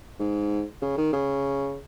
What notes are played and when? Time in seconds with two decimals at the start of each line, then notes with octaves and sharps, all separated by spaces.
0.20 G#2
0.82 C#3
0.98 D#3
1.13 C#3